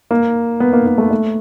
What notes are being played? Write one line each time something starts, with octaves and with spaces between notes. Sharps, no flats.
A#3
B3
A#3
A#3
A3
A3